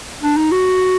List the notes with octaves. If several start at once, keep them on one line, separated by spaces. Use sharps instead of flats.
D4
D#4
F#4